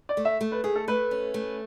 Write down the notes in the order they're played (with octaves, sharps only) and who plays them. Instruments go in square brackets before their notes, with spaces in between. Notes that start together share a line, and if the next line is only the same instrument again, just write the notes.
[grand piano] D5
[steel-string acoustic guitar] A3
[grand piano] E5
[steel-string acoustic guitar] A3
[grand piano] B4
[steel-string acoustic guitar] A3 [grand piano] G#4
[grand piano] A4
[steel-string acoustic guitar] A3 [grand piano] B4
[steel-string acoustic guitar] C#4
A3